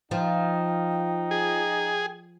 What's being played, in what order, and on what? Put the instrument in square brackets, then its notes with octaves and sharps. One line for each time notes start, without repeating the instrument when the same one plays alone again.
[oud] F3 [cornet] D#4 [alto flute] G5
[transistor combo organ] G#4